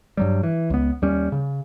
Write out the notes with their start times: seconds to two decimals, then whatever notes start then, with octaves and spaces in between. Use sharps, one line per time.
0.17 G2 F#3 G3
0.43 E3
0.70 C#2 B3
1.02 D#2 G3 C#4
1.32 C#3